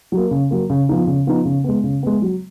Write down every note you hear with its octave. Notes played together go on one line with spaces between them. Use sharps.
F#3 A#3
C#3
F#3 A#3
C#3
F3 B3 D#4
C#3
F3 B3 D#4
C#3
G#3 B3
C#3
G#3 B3
F#3